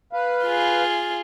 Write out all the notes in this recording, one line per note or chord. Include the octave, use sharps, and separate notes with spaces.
B4 F5
F4 G#4